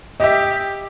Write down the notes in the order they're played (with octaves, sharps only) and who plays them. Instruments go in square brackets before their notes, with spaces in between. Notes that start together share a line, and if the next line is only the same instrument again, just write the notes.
[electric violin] G4 [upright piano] D#5 E5